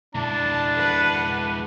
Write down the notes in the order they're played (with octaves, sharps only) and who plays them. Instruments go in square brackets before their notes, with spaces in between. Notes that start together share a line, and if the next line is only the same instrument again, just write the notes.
[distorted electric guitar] G#3 E4 [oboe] D4 [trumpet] A5
[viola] B4 F#5